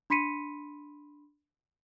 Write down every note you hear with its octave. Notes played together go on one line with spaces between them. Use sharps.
D4 B5 C6 B6 C#7 D#7